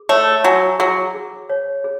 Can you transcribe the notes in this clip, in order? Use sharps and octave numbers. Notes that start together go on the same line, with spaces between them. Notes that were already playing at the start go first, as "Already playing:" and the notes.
Already playing: G#4
A3 C#5
F#3 G#5
F#3 G#4
G#4
C#5
G#4